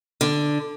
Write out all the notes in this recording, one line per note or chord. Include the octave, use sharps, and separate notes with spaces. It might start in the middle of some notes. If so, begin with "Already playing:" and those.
D3